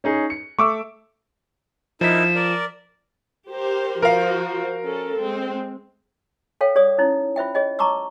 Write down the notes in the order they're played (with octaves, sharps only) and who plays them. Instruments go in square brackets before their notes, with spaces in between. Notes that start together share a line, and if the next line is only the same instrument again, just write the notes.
[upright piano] C#4 D#4 G#4
C#7
[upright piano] A3 [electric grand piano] C#6 D6 E6
[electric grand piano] F3 B6 [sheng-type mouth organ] D#4 E4 A#4 [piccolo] E7
[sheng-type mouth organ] A#4 D5
[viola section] G4 A#4 C5
[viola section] F3 F#4 C5 [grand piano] A#4 F5
[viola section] C#4 A4
G#3 C4
[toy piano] A4 C#5 F5 G5
G#4 C#5 D5 D#6
C#4 D#4 E4 C#5
F4 C5 E5 G5
G#4 C#5 D#5 G5
A5 A#5 C#6 D6 E6